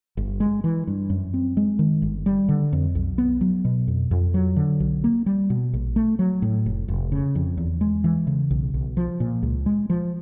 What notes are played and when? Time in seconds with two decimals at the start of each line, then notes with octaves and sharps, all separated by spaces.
0.17 G1
0.40 G#3
0.64 E3
0.87 G2
1.10 F#2
1.34 C4
1.57 G#3
1.79 D#3
2.02 G1
2.26 G3
2.49 D3
2.73 F2
2.95 B1
3.18 B3
3.41 F#3
3.65 B2
3.88 F2
4.11 F2
4.34 F#3
4.56 D3
4.80 B1
5.04 A#3
5.26 G3
5.50 B2
5.73 A#1
5.96 A3
6.19 F#3
6.42 A2
6.66 F1
6.88 F1
7.12 C#3
7.35 F2
7.57 E2
7.81 G#3
8.04 E3
8.27 C#3
8.51 B1
8.74 B1
8.97 F3
9.20 A#2
9.43 C#2
9.66 G#3
9.90 F3